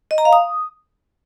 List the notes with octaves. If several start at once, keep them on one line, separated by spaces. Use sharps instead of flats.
D#5
A#5
F5
D#6